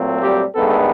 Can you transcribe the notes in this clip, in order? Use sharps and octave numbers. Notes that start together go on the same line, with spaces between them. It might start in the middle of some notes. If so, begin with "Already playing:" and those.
Already playing: A#2 F#3 A3 C4
G3 G4
G2 D#3 G#3 A3 B3 A4